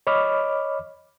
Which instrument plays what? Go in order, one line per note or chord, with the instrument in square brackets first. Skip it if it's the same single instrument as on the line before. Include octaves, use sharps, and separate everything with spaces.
[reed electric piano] C#5 D#5 B5 D6 F6